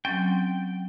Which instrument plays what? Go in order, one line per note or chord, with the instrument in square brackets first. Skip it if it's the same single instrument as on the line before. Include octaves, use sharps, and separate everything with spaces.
[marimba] F#3 C4 C#4 [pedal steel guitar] G5